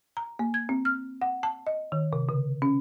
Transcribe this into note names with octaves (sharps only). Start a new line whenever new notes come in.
A#5
A#3
G#6
C4
F6
F#5
A5
D#5
D#3
C3
C#3
C#4